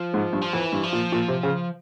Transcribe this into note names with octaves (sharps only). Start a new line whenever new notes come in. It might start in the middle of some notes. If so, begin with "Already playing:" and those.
Already playing: F3
G#2
G2
F3
F2 E3
G2
F3
A#2
A#2
C3
C#3